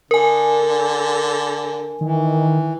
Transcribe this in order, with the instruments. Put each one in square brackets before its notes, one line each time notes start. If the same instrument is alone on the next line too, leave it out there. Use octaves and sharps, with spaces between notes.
[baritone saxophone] D3 [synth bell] A#4 G#5
[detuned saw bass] D#3 [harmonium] E3